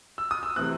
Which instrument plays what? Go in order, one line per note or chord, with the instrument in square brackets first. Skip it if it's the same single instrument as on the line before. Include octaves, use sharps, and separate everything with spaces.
[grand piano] E6
D#6
E6
C3 E3 A3 C4 F#6